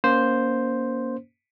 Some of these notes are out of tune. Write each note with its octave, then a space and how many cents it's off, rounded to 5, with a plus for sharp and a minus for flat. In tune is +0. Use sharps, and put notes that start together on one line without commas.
A#3 +20 C#4 +20 C5 +0